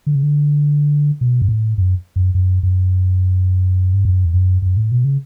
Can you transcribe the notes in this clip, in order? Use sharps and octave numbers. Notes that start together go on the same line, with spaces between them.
D3
C#3
D3
B2
G2
A2
F#2
F#2
F#2
F#2
G2
F#2
E2
F#2
F#2
A2
B2
C#3